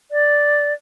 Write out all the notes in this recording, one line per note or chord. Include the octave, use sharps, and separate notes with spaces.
D5